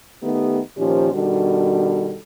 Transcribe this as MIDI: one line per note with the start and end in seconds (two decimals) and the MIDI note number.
0.23 0.60 51
0.23 0.60 57
0.23 0.60 59
0.23 0.60 63
0.23 0.60 67
0.78 1.11 46
0.78 1.11 51
0.78 1.11 53
0.78 1.11 61
0.78 1.11 67
0.78 1.11 72
1.13 2.18 47
1.13 2.18 51
1.13 2.18 55
1.13 2.18 62
1.13 2.18 66
1.13 2.18 69